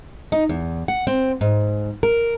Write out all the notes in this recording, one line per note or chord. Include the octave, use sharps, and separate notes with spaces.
D#4
E2
F#5
C4
G#2
A#4